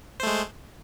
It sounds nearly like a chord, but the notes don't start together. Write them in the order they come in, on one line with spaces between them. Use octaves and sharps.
C5 A3 G#3